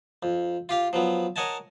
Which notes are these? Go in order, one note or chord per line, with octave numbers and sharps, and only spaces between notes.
F2
F4 G4 F5
F3 F#3 B3
A#4 C#5 D#5 F#5 G#5 A5